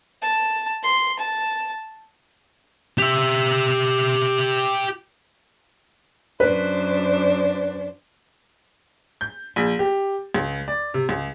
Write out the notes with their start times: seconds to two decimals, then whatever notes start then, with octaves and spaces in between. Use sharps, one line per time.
0.22 A5
0.84 C6
1.19 A5
2.98 G4 E5
6.40 F#2 D4 B4 C5
9.21 G6
9.56 A#1
9.79 G4
10.35 C#2
10.68 D5
10.94 C3
11.09 C#2